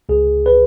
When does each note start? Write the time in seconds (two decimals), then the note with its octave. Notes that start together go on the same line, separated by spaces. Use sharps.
0.09 C#2 G#4
0.46 B4